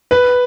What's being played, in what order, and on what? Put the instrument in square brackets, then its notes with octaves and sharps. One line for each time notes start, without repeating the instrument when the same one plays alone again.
[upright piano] B4